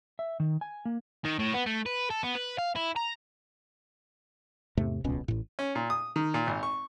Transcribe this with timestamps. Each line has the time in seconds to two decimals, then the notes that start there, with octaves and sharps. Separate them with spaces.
0.19 E5
0.40 D#3
0.61 G#5
0.85 A#3
1.25 D#3
1.39 A2
1.54 B3
1.66 A3
1.86 B4
2.10 A4
2.23 B3
2.35 B4
2.58 F5
2.76 E4
2.96 A#5
4.77 E2 G#2 C3 A3
5.04 D#1 C#2 B2 C#4
5.28 A1 A2
5.59 C#4
5.75 A#2
5.90 D#6
6.16 D#3
6.34 A#2
6.47 G#1
6.63 C#6